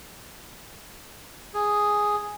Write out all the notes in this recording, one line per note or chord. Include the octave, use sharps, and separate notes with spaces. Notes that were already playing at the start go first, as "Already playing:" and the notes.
G#4